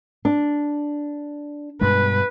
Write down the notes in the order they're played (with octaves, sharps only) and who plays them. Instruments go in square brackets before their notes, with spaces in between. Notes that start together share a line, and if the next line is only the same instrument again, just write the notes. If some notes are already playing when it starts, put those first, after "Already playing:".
[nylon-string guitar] D4
[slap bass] G2 B2 G#3 [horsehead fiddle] B4